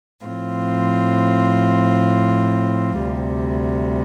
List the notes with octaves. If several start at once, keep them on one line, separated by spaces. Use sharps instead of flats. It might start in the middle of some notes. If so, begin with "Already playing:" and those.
A2 F3 C4 F4
D2 C3 G3